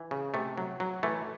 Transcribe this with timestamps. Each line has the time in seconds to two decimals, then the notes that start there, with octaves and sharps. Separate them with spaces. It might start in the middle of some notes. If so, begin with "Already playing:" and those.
Already playing: E3
0.11 C#3
0.34 C3 A3
0.58 F#3
0.80 F#3
1.03 E3 A3